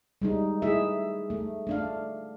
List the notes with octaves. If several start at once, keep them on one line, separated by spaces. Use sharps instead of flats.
G3 G#3 D#4
A3 E4 G#4 E5
A3
A3 D4 F5